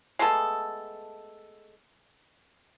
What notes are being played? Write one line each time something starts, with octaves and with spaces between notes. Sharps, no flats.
G#3 A3 B3 A4